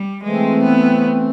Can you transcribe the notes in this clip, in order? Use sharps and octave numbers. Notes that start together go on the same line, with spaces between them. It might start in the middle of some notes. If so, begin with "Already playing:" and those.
Already playing: G3
E3 G#3 A3 C4
B3